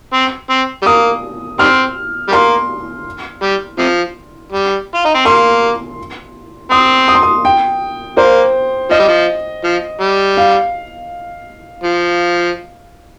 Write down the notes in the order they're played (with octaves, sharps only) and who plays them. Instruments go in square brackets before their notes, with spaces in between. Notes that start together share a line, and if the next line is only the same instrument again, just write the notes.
[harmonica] C4
C4
G3
[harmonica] A#3 [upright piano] D#6
[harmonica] D#3 G3 C4 [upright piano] F6
[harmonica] G3
[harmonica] A#3 [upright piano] C6
[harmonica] G3
C3 F3
G3
F4
D#4
C4
[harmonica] A#3 [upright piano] C6
[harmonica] C4 [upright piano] D#6
[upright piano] D#6
C6
D#6
G5
[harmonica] A#3 [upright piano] C5
[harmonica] F3 [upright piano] D#5
[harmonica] G3
F3
F3
G3
[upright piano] F5
[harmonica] F3